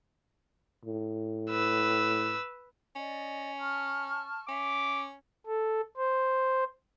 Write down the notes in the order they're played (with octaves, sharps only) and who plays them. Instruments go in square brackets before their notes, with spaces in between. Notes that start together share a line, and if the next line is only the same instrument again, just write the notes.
[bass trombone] A2
[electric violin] B4 E6
[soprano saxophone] C#4 [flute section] D5 D#5
[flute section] A5 C#6 F6
[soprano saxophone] C#4 [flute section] E5 [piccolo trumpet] D6
[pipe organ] A4
C5